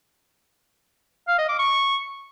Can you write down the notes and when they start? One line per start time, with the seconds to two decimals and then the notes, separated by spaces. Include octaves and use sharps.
1.28 F5
1.38 D#5
1.49 D6
1.59 C#6